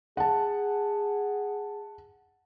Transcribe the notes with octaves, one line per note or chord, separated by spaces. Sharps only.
G#4 F#5 A5